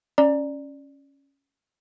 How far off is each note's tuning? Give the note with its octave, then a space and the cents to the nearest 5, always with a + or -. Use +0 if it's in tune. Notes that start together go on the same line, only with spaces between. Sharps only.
C#4 +0 D5 +10 A#5 +0